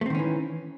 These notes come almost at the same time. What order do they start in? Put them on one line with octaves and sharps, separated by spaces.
A3 C4 D#3 C#4 E3